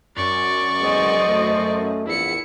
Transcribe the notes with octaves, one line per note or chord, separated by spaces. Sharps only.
F#2 D5 C#6
A1 G#3 B3 C5 D#5
A3
A#1 E2 E4 C#7